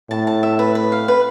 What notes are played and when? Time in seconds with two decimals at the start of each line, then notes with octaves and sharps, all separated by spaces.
0.10 A2 A5
0.27 A5
0.43 E5
0.59 B4
0.75 B4
0.92 F5
1.08 B4